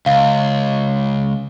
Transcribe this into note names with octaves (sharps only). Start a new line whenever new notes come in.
C#2 F5